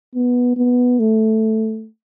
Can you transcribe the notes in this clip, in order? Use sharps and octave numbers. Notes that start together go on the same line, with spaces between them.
B3
B3
A3